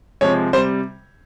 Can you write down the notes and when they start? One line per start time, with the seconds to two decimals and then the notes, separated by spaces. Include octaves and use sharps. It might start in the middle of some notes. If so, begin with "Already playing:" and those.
0.21 C3 F3 G#3 C#5
0.53 C3 G3 C5